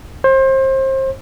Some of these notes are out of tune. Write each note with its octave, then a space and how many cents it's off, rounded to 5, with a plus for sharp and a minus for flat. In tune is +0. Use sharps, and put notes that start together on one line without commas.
C5 +30